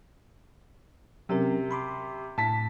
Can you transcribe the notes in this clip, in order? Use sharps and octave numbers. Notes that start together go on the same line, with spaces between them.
C3 F#3 C#4 A#4
B5 C6 D6
A2 A5 B6